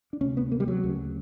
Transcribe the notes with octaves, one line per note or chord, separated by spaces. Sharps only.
D4
D2 C3 C#4
B3
A#3
G3
F#3
D2 C#3